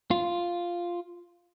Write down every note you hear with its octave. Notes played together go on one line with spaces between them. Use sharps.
F4